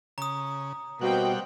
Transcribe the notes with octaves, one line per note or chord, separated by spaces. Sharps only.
C#3 A#5 D#6
B2 G3 A#3 C4 F#5 G5